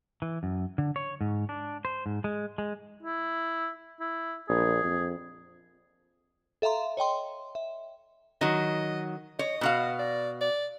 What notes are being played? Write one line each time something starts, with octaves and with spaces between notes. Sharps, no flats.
E3
F#2
D3
C#5
G#2
D4
C5
G#2
G#3
G#3
E4
E4
A#1 G#4
F2
A4 E5 F5 A#5 C6
C#5 D#5 G5 C6
E5
D#3 F#3 D#5
C#5 D#5
B2 F#4 F5
D5
D5